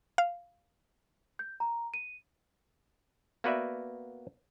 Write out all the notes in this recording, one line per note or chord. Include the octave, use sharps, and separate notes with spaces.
F5
G6
A#5
D#7
A#3 B3 F#4 B4 D5 E5